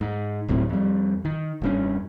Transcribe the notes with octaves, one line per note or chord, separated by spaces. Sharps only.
G#2
D1 B1 A2 C3
F2 G3
D#3
F1 G2 C#4